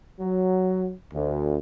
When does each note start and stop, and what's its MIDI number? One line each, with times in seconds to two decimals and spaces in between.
0.20 0.91 54
1.13 1.58 38